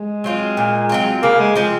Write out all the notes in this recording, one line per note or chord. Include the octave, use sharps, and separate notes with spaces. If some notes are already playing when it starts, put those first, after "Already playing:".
Already playing: G#3
F#3 C4 F4
A#2
F#3 C4 F4
C#3 A#3
G#3
F3 G#3 C4